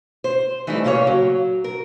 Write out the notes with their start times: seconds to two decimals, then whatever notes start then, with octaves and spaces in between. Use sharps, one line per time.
0.24 C5
0.67 E3 G3 A3 D#4 E4
0.84 A#2 C#3 A#3 A4 C#5
1.07 F#3
1.64 A#4